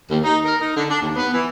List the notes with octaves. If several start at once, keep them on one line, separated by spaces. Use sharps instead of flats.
D#2
D#4
A#4
D#4
D3
D4
D#2
B3
E3